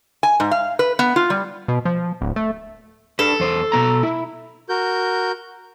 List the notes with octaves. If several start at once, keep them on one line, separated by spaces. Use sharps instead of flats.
G#5
G#2
F5
B4
B3
F4
G3
B2
F3
D1
A3
D4 A4 B4
E2 C5
B2 B3 A#5
E4
F#4 A#4 G6